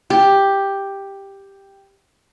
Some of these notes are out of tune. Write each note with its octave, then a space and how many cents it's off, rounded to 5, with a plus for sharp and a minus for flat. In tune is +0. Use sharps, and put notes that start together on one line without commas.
G4 +5